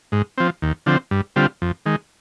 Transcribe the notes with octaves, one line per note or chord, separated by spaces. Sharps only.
G#2
F3 C4
D#2
D3 F3 C4
G2
D3 G3 C4 F4
F2
D#3 G#3